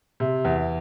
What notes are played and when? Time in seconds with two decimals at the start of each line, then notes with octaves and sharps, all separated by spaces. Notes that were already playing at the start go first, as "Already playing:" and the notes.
0.20 C3
0.45 E2